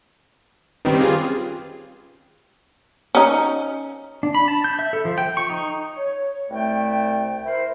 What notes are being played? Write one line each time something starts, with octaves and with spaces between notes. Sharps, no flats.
D#3 G3 C4 C#4 G4 B4
F4 G#4
C#4 D#4
D4
B5
A5
G6
E5
A4
F3
G5
C#6
D#4
C#5
C2 A3 G5
E4 A#4 C5